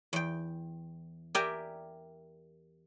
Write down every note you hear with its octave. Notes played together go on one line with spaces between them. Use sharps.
E2 G5
G4 A#4 D5 E5 G5 G#5